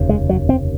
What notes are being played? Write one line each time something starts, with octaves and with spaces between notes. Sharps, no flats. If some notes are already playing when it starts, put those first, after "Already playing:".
Already playing: F1 D#2 C#3
G#3
F#3
C4